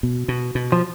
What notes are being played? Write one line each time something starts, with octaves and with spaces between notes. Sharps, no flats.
B2
B2
B2
F3